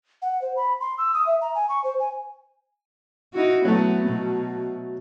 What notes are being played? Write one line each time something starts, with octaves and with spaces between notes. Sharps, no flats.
F#5
C5
B5
C6
E6
D#6
E5
A#5
G#5
C#6
C5
G#5
D#4 E4 F#4
F#3 A3 B3
B2